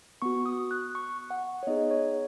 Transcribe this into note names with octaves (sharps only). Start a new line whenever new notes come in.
B3 F#4 C#6
D#6
F#6
C#6
F#5
C#5
B3 D#4 G#4 D#5
C#5